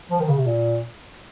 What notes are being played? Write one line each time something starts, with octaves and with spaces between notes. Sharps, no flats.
F3
D#3
C#3
C3
A#2